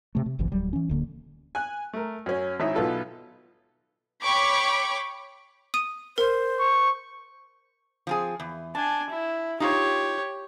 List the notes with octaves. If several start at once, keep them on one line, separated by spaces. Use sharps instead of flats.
C3 A3
C3
G1 C2 F#2 E3
D1 F#3 G3
E3 C#4
D1 D3 A#3
G#5 F#6
A3 A#4
F#2 C#4
G#1 C#4 D#4 E4 E5
B1 B3 F4 A4 B4
C#5 G5 B5 C#6 D6
D#6 D#7
A#4 C5
C#6
F3 C4 G#4
E2
D4 G#5 A5
E4
D#4 F4 G4 C#5